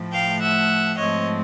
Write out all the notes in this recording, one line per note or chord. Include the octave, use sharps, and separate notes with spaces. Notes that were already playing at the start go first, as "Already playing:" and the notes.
Already playing: A2 F3 A3
F5 G5
E5 F#5
G#2 F3 A3 C4 C#5 D#5